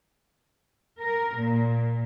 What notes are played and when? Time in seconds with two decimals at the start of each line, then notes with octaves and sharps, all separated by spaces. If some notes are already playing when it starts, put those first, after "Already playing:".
1.01 A#4
1.38 A#2